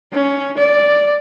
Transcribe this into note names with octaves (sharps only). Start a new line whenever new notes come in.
C#4
D5